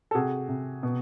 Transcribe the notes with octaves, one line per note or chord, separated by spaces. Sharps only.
A4
C3 F#4 G#4
C3
B2